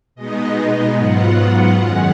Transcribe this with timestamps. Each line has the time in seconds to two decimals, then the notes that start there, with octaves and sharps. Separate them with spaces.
0.15 B2 G#3 B3 D#4 D#5
0.96 G#2 F#3 B3 F4 F#5
1.78 F#2 D#3 G#3 C#4